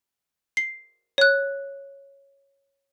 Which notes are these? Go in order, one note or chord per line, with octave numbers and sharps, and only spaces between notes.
C7
C#5 F#6